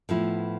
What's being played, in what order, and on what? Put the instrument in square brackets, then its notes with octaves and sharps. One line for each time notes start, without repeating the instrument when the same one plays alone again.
[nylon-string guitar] A2 F3 B3 E4